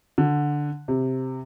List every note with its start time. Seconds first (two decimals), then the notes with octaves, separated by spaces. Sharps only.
0.18 D3
0.88 C3